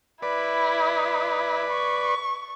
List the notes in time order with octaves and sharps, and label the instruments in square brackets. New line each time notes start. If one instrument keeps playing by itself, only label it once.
[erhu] E4 [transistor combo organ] B4 D5
[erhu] C#6